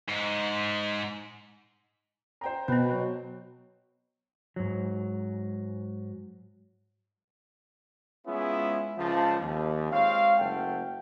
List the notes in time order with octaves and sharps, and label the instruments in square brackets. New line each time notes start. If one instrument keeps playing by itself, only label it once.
[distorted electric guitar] G#2
[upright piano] C5 G5 A#5
[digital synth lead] B2 [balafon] B3 C4 [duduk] B4
[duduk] F#3
[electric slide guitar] G#2 F#3
[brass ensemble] G#3 B3 C#4 E4 F4 G#4
C#2 F3 A5
D#2
G#3 C4 F4 C#5 F5
F#1 A3 F#5 G5